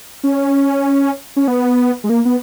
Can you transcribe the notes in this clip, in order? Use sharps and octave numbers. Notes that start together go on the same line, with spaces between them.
C#4
C#4
B3
G#3
A#3
B3